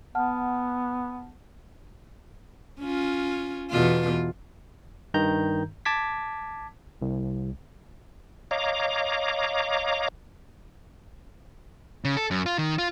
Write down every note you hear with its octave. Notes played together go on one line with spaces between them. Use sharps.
B3 F#5 A5 F6
C#4 F4
E2 B2 F4
G2 D#3 A#5 G6
A5 D6 G#6 B6
C2
C#5 D#5 F5 A#5 D6
C#3
A4
F#2
F4
D#3
F4